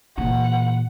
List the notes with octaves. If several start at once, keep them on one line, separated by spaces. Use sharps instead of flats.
A#2 E3 F#5